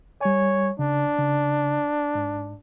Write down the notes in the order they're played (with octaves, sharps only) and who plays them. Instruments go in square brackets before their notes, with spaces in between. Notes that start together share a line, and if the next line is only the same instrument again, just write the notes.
[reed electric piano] G3 G#5 [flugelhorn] C#5
[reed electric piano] C#3 [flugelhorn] D4
[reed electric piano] C#3
G#2